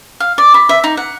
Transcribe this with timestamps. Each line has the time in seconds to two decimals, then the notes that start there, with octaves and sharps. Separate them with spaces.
0.20 F5
0.38 D5
0.54 B5
0.69 E5
0.84 D#4
0.97 F#5